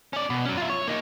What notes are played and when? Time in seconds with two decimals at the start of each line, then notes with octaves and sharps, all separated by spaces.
0.13 C#4 D5
0.30 B2
0.45 F#3 C#4
0.57 F4 E5
0.70 C#5
0.87 A#3 D#4